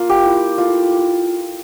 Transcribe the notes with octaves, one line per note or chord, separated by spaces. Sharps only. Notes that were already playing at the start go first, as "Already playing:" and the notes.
Already playing: A#3 F4
G4
E4
A3 F4